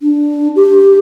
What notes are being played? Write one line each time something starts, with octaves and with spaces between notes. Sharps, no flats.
D4
G4